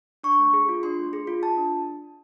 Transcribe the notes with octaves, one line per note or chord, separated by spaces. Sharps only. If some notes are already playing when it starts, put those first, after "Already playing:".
D4 C#6
A3
G#4
F4
D4 C6
A3
G#4
F4
F4 A5
D4